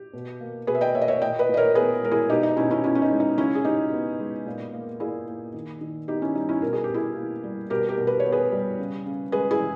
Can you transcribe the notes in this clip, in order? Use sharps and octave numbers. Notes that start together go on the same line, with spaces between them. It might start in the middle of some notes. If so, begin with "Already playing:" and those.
Already playing: G4
B2
A#3
B2 G#4 B4
E5
D#5 G5
A#3 C#5 E5
D#5
C#5 E5
A#2 D#5 G5
B4 D#5
A#2
D#5
A#4 C#5
B3 G#4 B4
G#3 A#4
E4 G#4
B2 D#4 G4
D#4
B2 C#4 E4
C#4 E4
B3 C#4 E4
C#4
D#4
G#3
D#4
C#3 C#4 E4
G#4
C#3 D#4 G4
B3
G#3
A#2
A#3
A#2 E4 G#4
A#3
D#3
D#3
B3 D#4 G4
C#4 E4
G3 D#4
C#4 E4
B2 A#4
G#4
G4
B2 E4 G#4
A#3
G3
B2 G4 A#4
G4 A#4
B2
B4
C#5
B3
G#4 B4
G3
C#3
C#3
G#3 G#4 B4
E4 G#4
E3